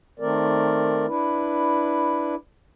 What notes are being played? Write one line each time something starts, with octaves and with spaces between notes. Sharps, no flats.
D#3 A3 C4 A#4 D5
D4 E4 B4